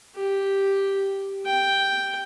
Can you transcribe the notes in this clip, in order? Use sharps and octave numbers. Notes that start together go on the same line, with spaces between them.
G4
G5